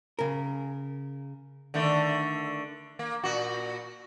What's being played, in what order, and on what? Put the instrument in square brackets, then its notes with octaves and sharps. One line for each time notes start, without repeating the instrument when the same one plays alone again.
[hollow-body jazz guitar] C#3 A#4
[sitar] D3 D#3 A3
A#3
A#2 F#4